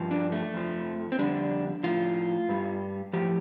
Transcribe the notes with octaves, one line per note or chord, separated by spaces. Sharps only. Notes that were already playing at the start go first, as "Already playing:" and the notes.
Already playing: G2 F3
D4
A3
F2 F3
C4
F2 D3 G3 D4
A2 F3 F4
G2 G3
A2 F3 G4